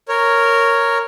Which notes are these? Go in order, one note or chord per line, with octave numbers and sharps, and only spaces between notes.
A#4 C#5